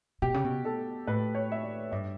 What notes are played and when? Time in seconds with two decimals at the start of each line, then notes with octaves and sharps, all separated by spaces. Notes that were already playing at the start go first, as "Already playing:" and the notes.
0.22 B2 G4
0.34 C#3
0.44 B2
0.65 A4
1.07 A2 B4
1.35 C#5
1.52 E5
1.63 D5
1.92 G2 E5